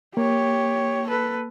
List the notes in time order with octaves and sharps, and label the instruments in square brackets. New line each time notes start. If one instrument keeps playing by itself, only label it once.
[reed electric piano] A#3 [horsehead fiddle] G4 C#5
[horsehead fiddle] A4 B4